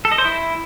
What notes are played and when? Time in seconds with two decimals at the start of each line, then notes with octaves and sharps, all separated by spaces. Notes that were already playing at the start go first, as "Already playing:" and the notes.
0.05 A4
0.12 D#5
0.18 C5
0.25 E4